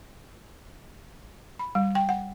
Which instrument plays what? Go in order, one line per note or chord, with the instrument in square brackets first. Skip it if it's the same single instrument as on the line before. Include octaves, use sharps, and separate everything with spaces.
[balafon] B5
G3
G5
F#5